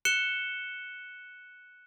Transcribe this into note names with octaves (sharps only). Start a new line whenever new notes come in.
F#6 C#7 E7 G7